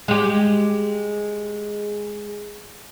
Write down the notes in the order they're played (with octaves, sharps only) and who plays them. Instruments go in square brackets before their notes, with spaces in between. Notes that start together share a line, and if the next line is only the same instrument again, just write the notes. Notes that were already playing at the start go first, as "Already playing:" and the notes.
[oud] G#3 G4